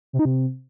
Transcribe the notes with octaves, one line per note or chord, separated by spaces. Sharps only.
C3
D#4
C3